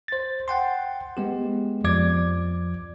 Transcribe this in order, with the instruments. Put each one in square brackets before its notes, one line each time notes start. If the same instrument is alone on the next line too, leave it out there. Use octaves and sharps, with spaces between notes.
[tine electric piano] C5 A6
F#5 G5 C6
G#3 B3 G4
F2 F3 D5 D6 G#6